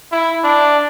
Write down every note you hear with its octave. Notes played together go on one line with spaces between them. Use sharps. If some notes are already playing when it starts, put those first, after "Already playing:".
E4
D4